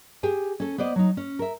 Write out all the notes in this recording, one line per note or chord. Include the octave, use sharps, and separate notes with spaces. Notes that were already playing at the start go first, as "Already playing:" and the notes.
G4 G#4 G#5
C#4 A4
B3 C5 D5 D#5
F#3 D#4
C#4
A#4 E5